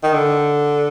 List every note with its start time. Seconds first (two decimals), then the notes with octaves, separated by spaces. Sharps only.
0.03 D#3
0.13 D3